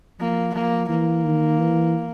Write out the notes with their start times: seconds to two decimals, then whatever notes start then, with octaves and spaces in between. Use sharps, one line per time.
0.20 F3 A#3
0.54 F3 A#3
0.89 E3 A#3
1.24 D#3
1.59 E3